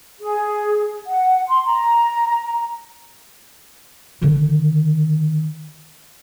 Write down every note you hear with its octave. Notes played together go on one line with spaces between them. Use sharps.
G#4
F#5
C6
A#5
D3 D#3